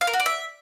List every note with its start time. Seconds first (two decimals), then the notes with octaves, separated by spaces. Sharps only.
0.01 F5
0.07 A#4
0.13 F#4
0.20 D5
0.26 E5